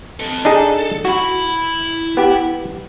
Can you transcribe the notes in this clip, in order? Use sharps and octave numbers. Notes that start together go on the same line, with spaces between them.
A4 D#5
D4 D#4 G#4 A4
E4 F#4 B5
B3 G4